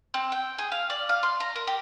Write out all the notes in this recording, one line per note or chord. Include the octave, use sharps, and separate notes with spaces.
C4
G5
G#4
F5
D5
F5
C6
A#5
A#4
G4